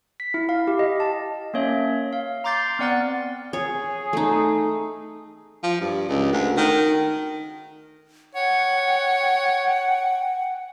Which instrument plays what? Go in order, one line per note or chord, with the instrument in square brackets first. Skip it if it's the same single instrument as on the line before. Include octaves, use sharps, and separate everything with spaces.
[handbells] B6
E4
F5
G4
D#5
A5
A#3 C#4 C#5 E5
F5
A#5 C6 D6 G6 A6 C7
B3 C4 D5 F#5 F#6 A6
[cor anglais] G#4 [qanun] C#5
[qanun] A3 D#4
[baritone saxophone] F3
G2
C#2
D2
D#3
[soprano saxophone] C#5 [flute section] F#5 G5